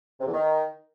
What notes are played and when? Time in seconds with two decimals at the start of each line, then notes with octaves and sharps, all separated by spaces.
0.20 C3
0.26 E2
0.32 D#3